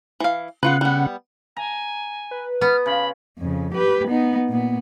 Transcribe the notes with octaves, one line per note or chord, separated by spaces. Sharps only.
E3 F5
C#3 B3 F4 B4 F#5
G3 B3
G#5 A#5
B4
B3 F6
C#3 F4 B5
F2 C#3
G4 B4
B3 D#4
A#2 B3